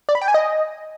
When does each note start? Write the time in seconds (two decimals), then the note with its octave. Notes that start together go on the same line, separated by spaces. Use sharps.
0.09 D5
0.15 B5
0.22 G5
0.28 G#5
0.34 D#5